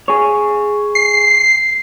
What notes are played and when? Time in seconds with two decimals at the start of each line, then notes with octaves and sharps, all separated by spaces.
0.08 G#4 C#5
0.95 C7